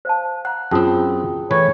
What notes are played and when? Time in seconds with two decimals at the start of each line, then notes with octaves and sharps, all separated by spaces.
0.05 C5 F5 A5
0.45 F#5 A#5 F#6
0.71 F#2 C4 F4 G#4 G5 A5 D#6
1.51 E3 A3 B4 C#5